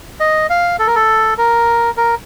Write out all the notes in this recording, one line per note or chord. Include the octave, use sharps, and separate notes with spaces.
D#5
F5
A4
A#4
A4
A#4
A#4